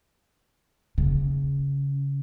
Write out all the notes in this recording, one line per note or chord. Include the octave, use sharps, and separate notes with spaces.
C#3